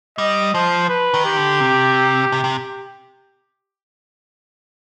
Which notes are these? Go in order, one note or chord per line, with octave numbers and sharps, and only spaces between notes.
G3 D#5
F3 C5
B4
D#3
G4
D3
C3
C3
C3